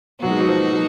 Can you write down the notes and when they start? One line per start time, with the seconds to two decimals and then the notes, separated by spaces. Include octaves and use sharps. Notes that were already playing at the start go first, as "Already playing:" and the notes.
0.22 B2 F#3 A#3 D#4 F#4
0.31 G#3
0.40 F#3
0.48 F3
0.72 F#3